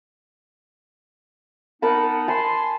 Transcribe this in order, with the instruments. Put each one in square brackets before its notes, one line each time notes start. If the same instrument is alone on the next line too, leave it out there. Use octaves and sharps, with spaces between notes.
[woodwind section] B3 D#4 F#5 [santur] A#4 A5 B5
[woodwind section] G#5 C6 [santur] A5 B5